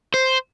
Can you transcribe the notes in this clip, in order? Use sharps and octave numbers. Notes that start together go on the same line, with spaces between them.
C5